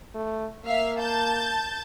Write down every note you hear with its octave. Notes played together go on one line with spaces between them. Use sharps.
A3
A#3 E5 F5
A5 G6 A6